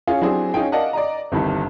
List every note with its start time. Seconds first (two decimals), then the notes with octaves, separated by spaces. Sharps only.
0.07 C#4 F4 G#4
0.21 F#3 C4 D4 E4 G4 G#4
0.54 C#4 D#4 F4 G#4 G5
0.72 A#4 D5 D#5 F5 F#5 A5
0.93 D5 D#5 A#5
1.32 G1 C2 G2 D#3